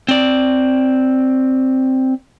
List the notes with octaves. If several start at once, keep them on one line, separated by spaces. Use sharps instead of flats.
C4 D5